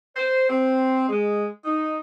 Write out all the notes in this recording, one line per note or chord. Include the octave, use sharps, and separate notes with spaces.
C5
C4
G#3
D#4